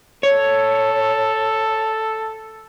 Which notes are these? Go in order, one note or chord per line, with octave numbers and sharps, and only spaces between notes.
A4 C#5